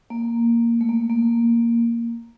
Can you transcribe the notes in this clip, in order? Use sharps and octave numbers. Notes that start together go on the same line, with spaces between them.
A#3
A3
A#3
A#3